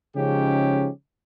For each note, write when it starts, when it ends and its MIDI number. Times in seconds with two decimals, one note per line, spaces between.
0.15 0.88 49
0.15 0.88 53
0.15 0.88 56
0.15 0.88 61
0.15 0.88 63
0.15 0.88 67